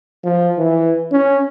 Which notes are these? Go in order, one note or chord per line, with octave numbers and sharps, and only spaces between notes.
F3
E3
C#4